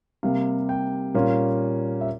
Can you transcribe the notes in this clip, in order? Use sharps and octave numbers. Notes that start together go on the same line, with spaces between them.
C3 G3 A#3 F5
G5
A#2 G3 A#3 C#4 F5
E5